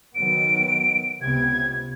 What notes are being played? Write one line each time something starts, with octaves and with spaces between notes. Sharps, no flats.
D#3 F#3 B3 D7
C#2 C3 B3 G#6